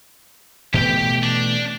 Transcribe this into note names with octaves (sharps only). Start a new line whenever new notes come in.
B2 E3 A3 G4 G5
D4